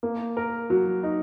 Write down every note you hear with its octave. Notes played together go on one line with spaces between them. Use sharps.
A#3
A#4
F#3
D#4